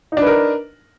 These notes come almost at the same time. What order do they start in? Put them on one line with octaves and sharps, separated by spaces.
D#4 D4 B4 A#4